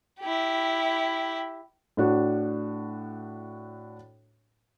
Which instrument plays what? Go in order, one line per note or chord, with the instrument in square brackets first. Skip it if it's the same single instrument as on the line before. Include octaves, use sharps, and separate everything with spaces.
[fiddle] E4 G4
[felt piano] A2 D4 F#4